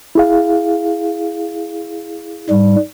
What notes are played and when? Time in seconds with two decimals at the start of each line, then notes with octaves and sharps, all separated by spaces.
0.15 E4 G#4 F5
2.50 G#2 G3